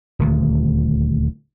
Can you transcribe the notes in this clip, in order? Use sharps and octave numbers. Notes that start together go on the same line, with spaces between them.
D#1 D2